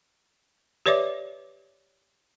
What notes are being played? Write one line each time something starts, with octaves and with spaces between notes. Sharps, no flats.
G4 B4 C#5 D5 E5 D6